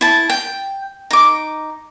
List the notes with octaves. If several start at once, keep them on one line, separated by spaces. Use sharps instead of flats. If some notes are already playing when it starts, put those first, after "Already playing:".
E4 A5
G5
D#4 D6